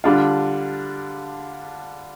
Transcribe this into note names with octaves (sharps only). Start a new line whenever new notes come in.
D3 G3 D4 F4